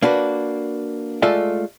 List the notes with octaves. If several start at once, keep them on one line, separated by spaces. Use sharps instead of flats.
A#3 D4 F#4 B4
G#3 A3 F4 A4 D5 E5